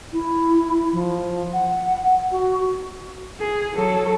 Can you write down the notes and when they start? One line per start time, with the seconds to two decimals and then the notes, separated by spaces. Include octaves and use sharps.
0.13 E4
0.93 F3
1.53 F#5
2.32 F#4
3.40 G#4
3.74 F#3 A4